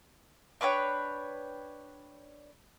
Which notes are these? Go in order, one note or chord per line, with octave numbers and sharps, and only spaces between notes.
D4 B4 C#5 G5